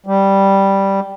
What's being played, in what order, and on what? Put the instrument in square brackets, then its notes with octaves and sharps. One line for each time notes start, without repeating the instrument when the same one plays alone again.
[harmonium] G3